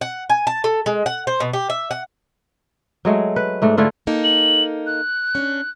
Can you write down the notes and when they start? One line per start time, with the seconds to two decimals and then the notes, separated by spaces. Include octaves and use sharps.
0.01 F#5
0.30 G#5
0.47 A5
0.64 A4
0.86 G#3
1.06 F#5
1.27 C5
1.40 B2
1.53 G4
1.70 E5
1.91 F#5
3.05 F#3 G#3 A3
3.36 B4
3.62 G#2 A3 D4
3.78 D3 A3 E4 F4
4.07 A#3 D#4 A4
4.24 F#7
4.86 F#6
5.35 C#4 D4